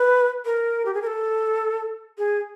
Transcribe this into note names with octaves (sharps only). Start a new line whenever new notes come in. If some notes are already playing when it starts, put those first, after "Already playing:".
Already playing: B4
A#4
G4
G#4
A#4
A4
G#4